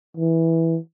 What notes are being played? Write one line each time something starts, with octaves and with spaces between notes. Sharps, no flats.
E3